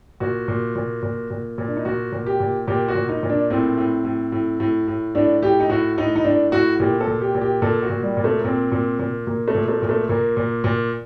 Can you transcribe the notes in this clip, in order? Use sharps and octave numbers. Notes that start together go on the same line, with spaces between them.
A#2 F#4
A#2
A#2
A#2
A#2
A#2
D4
D#4
A#2 F#4
A#2
G4
A#2
A#2 G4
F#4
A#2
D#4
A#2
D4
A2 C4
A2
A2
A2
A2
A2
A2 D4
A2 G4
D#4
A2 F#4
A2 D#4
D#4
A2 D4
A2 F#4
A#2 G4
A4
A#2
G4
A#2
G4
A#2 A4
F#4
A#2
G3
A#2
A3
A#3
A#2 C4
A#2
A#2
A#2 A#3
A3
A#2
A3
A#2
A3
A#2 A#3
A#2
A#2